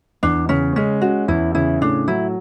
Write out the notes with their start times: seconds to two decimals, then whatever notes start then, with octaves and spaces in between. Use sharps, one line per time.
0.23 E2 D4
0.49 C#3 C#4
0.76 G#3 C#4
1.02 C#4 F#4
1.28 E2 E4
1.55 C#3 E4
1.81 A2 D4
2.08 F#3 E4